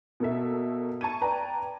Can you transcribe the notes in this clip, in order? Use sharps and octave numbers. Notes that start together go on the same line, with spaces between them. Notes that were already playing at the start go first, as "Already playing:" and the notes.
B2 A#3 A4 E5
A5 C#6 G#6 D#7
B4 D5 G5 A5 A#5